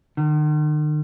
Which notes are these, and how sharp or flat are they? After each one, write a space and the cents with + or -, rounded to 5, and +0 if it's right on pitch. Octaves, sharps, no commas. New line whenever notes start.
D#3 -45